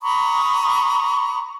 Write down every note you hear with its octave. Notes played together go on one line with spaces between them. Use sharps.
A#5 B5 C#6 D#6